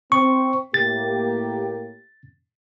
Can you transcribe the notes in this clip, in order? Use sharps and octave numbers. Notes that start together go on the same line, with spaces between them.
C4 C#6
A2 A#3 G4 A6